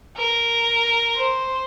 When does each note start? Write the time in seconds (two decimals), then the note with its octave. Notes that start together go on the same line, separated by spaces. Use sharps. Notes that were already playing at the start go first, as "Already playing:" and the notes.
0.17 A#4
1.16 C5